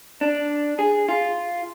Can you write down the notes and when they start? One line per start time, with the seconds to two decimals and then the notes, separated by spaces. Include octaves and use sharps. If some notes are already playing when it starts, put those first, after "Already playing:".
0.21 D4
0.79 G#4
1.09 F4